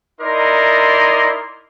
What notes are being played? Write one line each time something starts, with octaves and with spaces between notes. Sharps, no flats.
D#4 E4 A#4 D5 D#5 C6